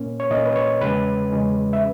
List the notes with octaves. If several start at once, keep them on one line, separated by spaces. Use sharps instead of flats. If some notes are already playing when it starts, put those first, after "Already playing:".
Already playing: A#2 A#3 C#4
C#5
A#2 A#3 C#4 D#5
B4
C#5
E2 C#3 G#3 C#4 B4
E2 C#3 G#3 C#4
E5